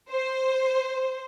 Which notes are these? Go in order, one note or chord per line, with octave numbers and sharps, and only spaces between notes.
C5